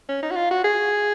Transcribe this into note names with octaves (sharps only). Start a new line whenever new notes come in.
C#4
D#4
F#4
F4
F#4
G#4